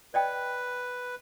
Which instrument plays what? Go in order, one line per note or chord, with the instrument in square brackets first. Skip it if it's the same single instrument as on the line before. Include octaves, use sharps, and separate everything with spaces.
[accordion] B4 [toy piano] D5 D#5 G5